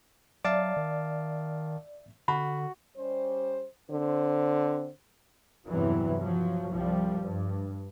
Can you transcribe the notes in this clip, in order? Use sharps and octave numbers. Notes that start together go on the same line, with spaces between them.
F#3 D5 E5 F5 A5 D6
D#3
D3 F#4 B5
G3 C#4 C5
D3 C4 C5
E2 G2 C3 E3 F#3
F3 F#3
C2 F3 G3
G2